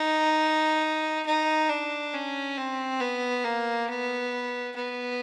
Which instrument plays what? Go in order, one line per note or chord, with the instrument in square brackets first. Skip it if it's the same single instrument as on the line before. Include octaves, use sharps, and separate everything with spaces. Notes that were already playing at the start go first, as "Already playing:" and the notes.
Already playing: [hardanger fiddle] D#4
D#4
D4
C#4
C4
B3
A#3
B3
B3